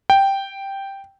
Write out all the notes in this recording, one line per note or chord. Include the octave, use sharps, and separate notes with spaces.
G5